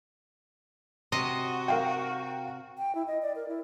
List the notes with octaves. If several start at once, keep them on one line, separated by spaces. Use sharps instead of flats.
C3 F#4 D#5
A#4 F5 G5
G5
E4
D#5
D5
A#4
E4